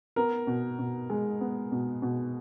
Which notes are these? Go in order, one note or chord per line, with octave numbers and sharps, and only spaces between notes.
B3 A#4
B2
B2
G#3
B3
B2
B2